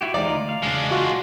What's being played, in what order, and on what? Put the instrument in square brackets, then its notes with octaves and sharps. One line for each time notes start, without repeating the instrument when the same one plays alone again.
[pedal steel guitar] E4 F#4 G4
[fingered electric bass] D#2 E3 G#3 [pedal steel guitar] D#4 F4 [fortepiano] D5
[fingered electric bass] D3 A3
[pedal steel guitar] F5
[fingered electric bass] E1 C#3 [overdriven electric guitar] G#3 D4
[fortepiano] F4 F#4